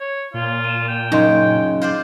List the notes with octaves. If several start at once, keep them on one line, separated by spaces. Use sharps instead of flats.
C#5
A#2 F4
D#7 E7
G5
F#2 C#3 D#4 D#5 C6
F4 C5 D5